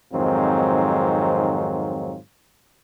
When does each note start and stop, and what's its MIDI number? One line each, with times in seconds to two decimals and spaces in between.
0.13 2.17 41
0.13 2.17 44
0.13 2.17 51
0.13 2.17 54
0.13 2.17 60
0.13 2.17 65